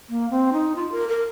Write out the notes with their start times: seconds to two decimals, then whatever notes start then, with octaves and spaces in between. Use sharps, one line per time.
0.09 A#3
0.30 C4
0.53 D#4
0.76 F4
0.92 A#4
1.09 A#4